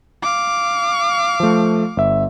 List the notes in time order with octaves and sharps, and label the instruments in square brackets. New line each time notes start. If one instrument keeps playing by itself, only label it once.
[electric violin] F5 D6
[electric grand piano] F3 A3
G1 E5